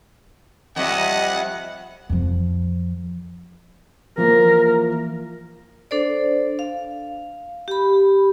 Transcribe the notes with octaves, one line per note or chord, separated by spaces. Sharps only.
F2 G3 D#5 E5 F#5
F2 F3
E3 F3 A#3 A#4
D4 A4 C5 D5
F5
G4 B5